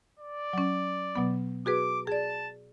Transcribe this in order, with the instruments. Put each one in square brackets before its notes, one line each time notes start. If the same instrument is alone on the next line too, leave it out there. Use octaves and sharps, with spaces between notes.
[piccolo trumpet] D5
[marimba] F#3 C#4
B2 F#3 B3
[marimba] F#4 G#4 B4 [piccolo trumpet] D6
[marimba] G#4 D5 [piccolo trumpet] A5